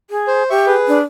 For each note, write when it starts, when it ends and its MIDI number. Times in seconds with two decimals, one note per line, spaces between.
0.10 0.43 68
0.27 0.49 72
0.50 0.74 67
0.50 0.65 76
0.50 0.65 85
0.67 0.98 68
0.67 0.98 71
0.88 1.01 62